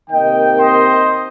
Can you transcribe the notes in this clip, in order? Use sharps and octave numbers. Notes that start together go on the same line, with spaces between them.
C3 D#3 A#3 D#5 G5
C5 D#5